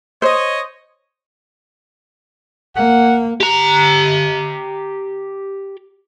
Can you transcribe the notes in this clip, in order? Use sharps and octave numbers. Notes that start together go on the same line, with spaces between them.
C5 C#5 D#5
A#3 F#5
G4 A#5